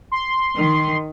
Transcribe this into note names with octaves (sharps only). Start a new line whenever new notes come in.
C6
D#3